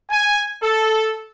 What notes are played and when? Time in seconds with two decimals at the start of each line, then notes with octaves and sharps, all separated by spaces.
0.10 G#5
0.62 A4